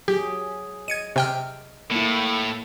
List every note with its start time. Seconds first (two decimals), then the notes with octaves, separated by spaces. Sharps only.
0.08 F#3 G4 G#4
0.88 D#5 G#6 C#7 D#7
1.16 C3 G5 F6
1.91 A2 A#3 E4